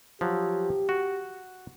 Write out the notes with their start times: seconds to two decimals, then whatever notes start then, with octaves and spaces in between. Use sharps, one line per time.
0.21 F3 F#3 G4
0.89 F#4